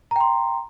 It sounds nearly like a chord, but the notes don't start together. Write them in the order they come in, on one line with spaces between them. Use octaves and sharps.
A#5 G5 C6